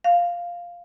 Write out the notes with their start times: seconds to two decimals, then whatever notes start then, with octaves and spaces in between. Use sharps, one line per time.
0.04 F5